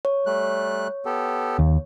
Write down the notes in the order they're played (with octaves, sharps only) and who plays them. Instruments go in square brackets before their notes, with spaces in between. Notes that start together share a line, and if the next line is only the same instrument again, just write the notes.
[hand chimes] C#5
[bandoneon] G3 A3 F#6
B3 G4 A4
[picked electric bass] D#2